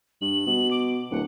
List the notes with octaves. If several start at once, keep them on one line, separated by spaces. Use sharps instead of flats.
G2 F#7
B2
D6
D1 F#5